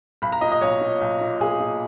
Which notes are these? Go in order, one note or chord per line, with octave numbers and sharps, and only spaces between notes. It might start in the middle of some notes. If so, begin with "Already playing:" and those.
B1 B5
A#5
A#2 D#5
D#5
B1 C#5
A#2
B1
A#2
B1 G#4
A#2